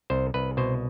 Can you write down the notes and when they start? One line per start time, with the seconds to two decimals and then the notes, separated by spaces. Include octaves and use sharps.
0.10 C2 C5
0.34 C2 B4
0.57 B2 C5